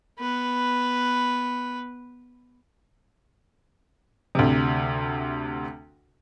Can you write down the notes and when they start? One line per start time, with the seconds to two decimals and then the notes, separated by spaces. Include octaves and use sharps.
0.19 B3 B4
4.35 D2 C3